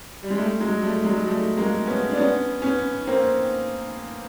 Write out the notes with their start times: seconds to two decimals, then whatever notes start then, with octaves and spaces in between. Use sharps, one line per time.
0.23 G3
0.30 G#3
0.37 G3 A3
0.60 F#3 G#3
0.82 G3 A3
1.00 G3
1.05 F#3 G#3
1.27 G3 A3
1.57 G#3 A#3
1.87 B3 C#4
2.11 D4
2.17 B3 C#4
2.62 B3 C#4
3.07 A#3 C4